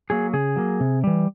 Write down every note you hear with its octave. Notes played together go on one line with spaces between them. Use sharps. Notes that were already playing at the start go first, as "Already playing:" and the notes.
F#3 A#3 G#4
C#3 G#4
F#3 A#3
C3
E3 G3